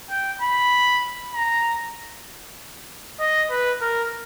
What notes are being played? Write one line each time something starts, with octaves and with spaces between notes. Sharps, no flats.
G5
B5
A#5
D#5
B4
A#4